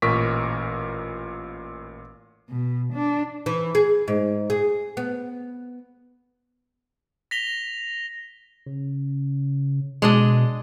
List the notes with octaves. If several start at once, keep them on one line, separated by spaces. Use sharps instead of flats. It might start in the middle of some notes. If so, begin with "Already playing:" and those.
A1 A#2 A#4 C#6 D6 B6
B2
D4
E3
G#4
G#2
G#4
B3
A#6 B6 F7 G7
C#3
B2 G#3 D4 D#5